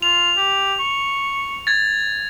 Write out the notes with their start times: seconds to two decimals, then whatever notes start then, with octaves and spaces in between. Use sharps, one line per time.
0.02 F4 F7
0.37 G4
0.79 C#6
1.67 G#6 A6